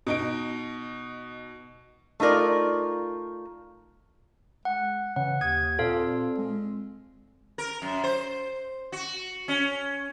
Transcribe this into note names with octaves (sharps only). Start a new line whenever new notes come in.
B2 D#4 D7
A3 D#4 F4 A#4 D5
G#3 F#5
C#3 E3 F#5
D#2 D#6 G#6
A#2 C4 A4 F5
G#3
A#4
F#2
C5
F#4
C#4